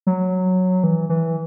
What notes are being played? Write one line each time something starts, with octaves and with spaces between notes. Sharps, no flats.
F#3
E3
E3